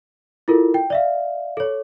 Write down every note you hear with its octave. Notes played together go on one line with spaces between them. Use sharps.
E4 F4 A4 A#4
G5
D5 E5 F5
A4 C#5